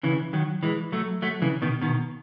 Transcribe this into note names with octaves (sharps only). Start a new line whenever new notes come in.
C#3 E3
D#3 F#3
E3 G#3
F#3 A3
F#3 A3
C#3 E3
B2 D#3
B2 D#3